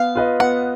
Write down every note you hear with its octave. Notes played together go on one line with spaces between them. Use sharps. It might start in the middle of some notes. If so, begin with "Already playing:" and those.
Already playing: B3 F5
F4 B4 D#5
B3 F#5